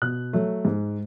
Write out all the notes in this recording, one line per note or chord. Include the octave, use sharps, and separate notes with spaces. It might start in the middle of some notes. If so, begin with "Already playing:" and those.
B2 F#6
F#3 A3
G#2